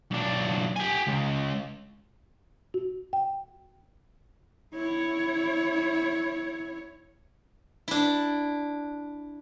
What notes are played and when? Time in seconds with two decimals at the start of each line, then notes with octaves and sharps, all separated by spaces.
0.11 B1 D4
0.76 G4 G#5
1.07 C#2
2.74 F#4
3.13 G5
4.75 E4 C#5
7.88 D4 E4